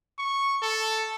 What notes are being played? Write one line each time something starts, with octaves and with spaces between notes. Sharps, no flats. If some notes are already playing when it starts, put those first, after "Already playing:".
C#6
A4